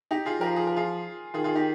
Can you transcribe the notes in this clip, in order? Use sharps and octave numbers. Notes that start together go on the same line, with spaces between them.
D#4 G4
F4 G#4
F3 G4 A#4
G#4
A#4
F4 G#4
D#3 F4 G#4
F4 G#4
D#4 G4